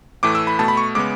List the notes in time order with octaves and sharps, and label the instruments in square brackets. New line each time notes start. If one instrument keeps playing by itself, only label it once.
[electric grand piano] A2 E3 A3 D6
E6
B5
B2 A3 A5
B5
C#6
C#3 G#3 B3 D6